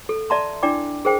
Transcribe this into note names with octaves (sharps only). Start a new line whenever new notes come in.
A4
D5 E5 A5 A#5 C6
D4 E4 D5 G5 D6
G#4 A#4 C5 G5